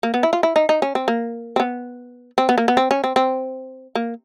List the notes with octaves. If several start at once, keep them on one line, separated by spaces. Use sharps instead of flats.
A#3
B3
E4
F4
E4
D#4
D#4
C#4
C4
A#3
C4
B3
C4
B3
A#3
B3
C4
C#4
C4
C4
A#3